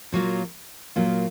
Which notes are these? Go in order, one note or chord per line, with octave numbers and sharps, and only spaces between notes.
A#2 F#3 A#3 F4
A#2 F#3 A#3 F4